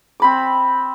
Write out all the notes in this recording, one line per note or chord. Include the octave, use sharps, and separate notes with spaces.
C4 B5 D6